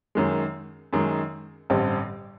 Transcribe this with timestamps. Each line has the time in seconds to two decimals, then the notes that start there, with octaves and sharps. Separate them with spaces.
0.15 F#2 D#3 G#3
0.93 F#2 D#3 G#3
1.70 A1 G2 D3 G3 C4